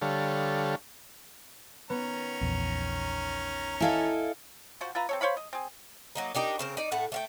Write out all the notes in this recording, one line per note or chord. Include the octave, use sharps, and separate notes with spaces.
D3 G3 A4 C#5 F5
D#3 B3 C#4 A#5
A#1 E2
E4 A4 D#5 F5 G#5
F3 F#4 C5
F4 B4 E5 A#5
C4 A4 C#5
C5 C#5 F5 B5
D#5
C4 G#4
F#3 A#3 D#4
D4 D#4 G4 A#4
C#3 C4 A#4
D#4 D5
A2 A3 F#5
A3 F5 G5